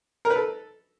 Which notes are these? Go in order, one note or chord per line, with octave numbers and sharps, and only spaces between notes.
A#4
B4
A4